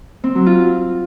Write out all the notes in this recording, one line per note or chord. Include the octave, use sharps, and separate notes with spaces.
C4
F#3
F4